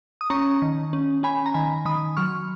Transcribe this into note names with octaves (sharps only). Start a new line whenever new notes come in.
D#6
C#4 A#5 C#6
D#3
C#4
C#4 G#5 B5
A#5
D#3 G#5 B5
D#3 B5 D#6
F#3 C#6 F6